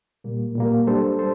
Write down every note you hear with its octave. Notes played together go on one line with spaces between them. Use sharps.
A#2 G3 A#3
A#2 G3 A#3
G3 D4 A4 C5
A4 C5